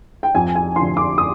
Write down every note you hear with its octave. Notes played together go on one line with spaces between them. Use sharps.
G5
F2 G#5
G#5
D3 F3 C6
D6
D#6